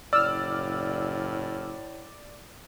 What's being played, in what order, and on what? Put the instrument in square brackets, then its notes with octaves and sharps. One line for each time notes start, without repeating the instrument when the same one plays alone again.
[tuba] F#1 [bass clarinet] A2 [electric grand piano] D5 [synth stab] E6 F6